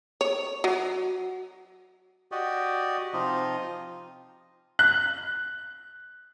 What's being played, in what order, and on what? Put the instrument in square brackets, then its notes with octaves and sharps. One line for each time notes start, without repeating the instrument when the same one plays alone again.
[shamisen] C#5
F#3
[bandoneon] F#4 G4 D5 D#5
C3 F3 D#4 F4 D#5
[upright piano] F#6